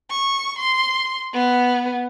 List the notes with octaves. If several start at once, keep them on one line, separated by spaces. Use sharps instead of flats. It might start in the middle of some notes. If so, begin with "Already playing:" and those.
C#6
C6
B3